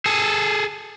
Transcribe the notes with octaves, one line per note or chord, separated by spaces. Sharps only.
G#4 A4